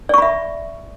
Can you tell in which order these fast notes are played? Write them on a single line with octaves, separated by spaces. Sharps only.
D5 C#6 B5 E5